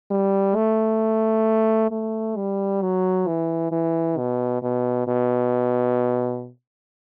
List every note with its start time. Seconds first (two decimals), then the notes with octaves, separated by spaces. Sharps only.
0.11 G3
0.56 A3
1.91 A3
2.36 G3
2.82 F#3
3.27 E3
3.72 E3
4.18 B2
4.63 B2
5.08 B2